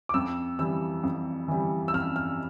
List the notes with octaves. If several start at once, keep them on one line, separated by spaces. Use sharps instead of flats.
D6
F2 E6
E3 G3 E6
F2
E3 G3
E6
F2 F6
F6